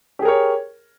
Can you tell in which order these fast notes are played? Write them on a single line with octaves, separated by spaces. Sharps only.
G4 G#4 A#4 C#5